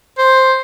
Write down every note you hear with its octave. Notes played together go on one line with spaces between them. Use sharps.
C5